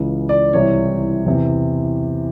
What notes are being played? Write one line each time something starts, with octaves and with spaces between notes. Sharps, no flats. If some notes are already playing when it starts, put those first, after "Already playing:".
Already playing: C#2 C#3 E3
D5
C2 C3 E3 C#5
E2 C3 E3